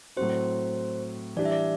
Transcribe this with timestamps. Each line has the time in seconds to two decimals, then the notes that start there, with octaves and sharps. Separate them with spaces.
0.16 A2 F#3 C4 F#4 C5
1.36 E3 G3 D4 G4 D5
1.45 E5
1.52 D5